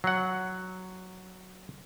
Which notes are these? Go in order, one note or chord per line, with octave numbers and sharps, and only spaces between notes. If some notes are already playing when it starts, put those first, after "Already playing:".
F#3 F#5